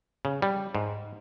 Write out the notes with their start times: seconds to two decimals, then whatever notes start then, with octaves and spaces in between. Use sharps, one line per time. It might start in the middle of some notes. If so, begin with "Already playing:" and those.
0.25 C#3
0.42 G3
0.75 G#2